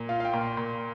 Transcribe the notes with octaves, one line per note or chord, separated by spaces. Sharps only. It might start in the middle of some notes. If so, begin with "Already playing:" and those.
Already playing: A#2
F4 F5
F5
G5
A#2
C6
A#2